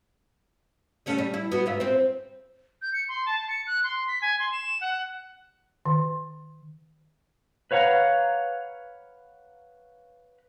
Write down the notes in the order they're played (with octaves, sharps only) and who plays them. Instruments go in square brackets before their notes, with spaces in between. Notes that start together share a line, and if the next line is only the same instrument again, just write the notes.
[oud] G3 A3 C#4
G3
E4
B3 F#4
G#2 F4 E5
C4 C5
[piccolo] G6
C#7
C6
A5
C#7
F#6
C6
B6
G#5
C6
E7
F#5
[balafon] D#3
[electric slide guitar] B4 C#5 F5 F#5 A#5